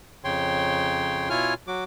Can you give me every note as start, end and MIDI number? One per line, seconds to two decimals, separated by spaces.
0.24 1.29 41
0.24 1.29 49
0.24 1.29 73
0.24 1.29 79
0.24 1.29 84
1.30 1.54 47
1.30 1.54 64
1.30 1.54 65
1.30 1.54 73
1.30 1.54 80
1.30 1.54 89
1.67 1.84 54
1.67 1.84 66
1.67 1.84 86